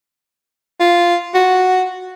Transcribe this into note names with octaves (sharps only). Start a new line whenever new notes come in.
F4
F#4